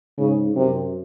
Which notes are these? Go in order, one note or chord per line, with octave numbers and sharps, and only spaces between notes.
G#2 C#3
F#2 C3